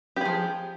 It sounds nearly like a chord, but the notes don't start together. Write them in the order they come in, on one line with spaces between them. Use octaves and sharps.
G4 G#4 F3